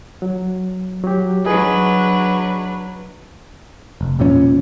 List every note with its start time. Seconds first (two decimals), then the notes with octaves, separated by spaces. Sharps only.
0.22 F#3
1.03 F#3 G4
1.45 F#3 D4 G#4 B4 D#5
4.01 F1
4.19 E1 A#2 F3 C#4